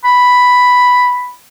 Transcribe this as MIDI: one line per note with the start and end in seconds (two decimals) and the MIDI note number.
0.05 1.32 83